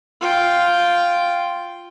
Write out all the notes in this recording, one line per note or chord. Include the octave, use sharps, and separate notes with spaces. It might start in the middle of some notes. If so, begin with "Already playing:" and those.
F4 G5